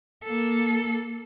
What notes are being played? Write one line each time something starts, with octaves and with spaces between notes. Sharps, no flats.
A#3 A4